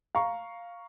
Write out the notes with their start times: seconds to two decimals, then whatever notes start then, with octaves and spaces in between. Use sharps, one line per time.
0.15 F5 A#5 C#6